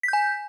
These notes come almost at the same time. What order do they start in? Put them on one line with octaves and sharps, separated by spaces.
B6 G6 G#5